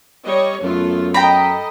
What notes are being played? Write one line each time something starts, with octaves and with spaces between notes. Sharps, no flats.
G3 C#5 D#5
F#2 A3 B3 F4
A4 D#5 G5 A#5 B5